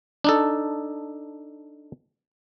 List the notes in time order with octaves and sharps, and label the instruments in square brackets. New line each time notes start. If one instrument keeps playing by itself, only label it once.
[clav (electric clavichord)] D4 D#4 A4